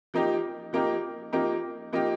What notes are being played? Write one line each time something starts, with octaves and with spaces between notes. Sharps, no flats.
F3 A#3 D#4 G4
F3 A#3 D#4 G4
F3 A#3 D#4 G4
F3 A#3 D#4 G4